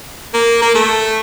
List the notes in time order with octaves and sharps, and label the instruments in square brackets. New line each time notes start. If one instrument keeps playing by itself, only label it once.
[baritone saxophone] A#3
A#3
A3